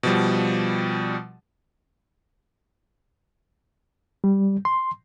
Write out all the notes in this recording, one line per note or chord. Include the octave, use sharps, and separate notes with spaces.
B2 F3 G3
G3
C6